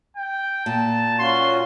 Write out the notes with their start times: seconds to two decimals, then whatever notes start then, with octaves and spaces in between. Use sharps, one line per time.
0.17 G5
0.66 A#2 A5
1.19 C#4 F4 F#4 C6